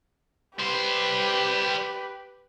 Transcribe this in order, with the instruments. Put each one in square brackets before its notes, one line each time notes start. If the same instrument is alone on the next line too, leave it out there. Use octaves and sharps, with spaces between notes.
[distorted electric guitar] G3 C5 [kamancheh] G4 B4